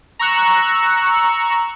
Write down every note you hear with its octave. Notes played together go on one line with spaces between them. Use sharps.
A#5 C#6 E6 F#6